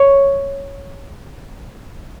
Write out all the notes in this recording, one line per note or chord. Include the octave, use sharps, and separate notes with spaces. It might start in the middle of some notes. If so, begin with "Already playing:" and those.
Already playing: C#5